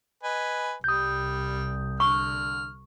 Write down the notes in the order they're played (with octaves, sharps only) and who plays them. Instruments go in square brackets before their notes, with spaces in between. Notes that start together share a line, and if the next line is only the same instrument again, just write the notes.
[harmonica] B4 D#5 G#5
[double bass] C2 [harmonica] G3 [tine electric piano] D#6 G6
[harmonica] D3 F6 [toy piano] C#6